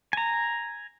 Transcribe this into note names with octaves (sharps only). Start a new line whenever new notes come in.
G#5 A#5